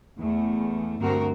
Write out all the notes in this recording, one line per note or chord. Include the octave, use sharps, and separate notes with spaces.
E2 A3
D2 G2 C4 F#4 A#4